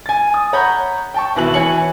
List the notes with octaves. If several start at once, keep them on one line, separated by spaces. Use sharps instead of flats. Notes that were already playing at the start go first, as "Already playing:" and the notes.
G#5 A6
D#6
C#5 F#5 A#5 B5 G6
G5 A5 C#6
G#1 B2 E3 E5 F#7
E3 C#5 G#5 C#7 F#7